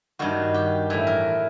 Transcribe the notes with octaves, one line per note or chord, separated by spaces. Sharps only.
G2 D#3 F#4
G4
A2 E3
A#4